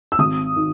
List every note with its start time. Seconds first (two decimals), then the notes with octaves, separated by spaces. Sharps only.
0.12 E6
0.19 G#1 D#6
0.56 D#3